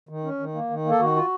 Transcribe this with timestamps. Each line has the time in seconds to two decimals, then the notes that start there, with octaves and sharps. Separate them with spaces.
0.09 D#3
0.24 C#4
0.39 D#3
0.55 A#3
0.70 D#3
0.85 A#3
0.91 A4
0.99 D#3 F#4
1.15 F4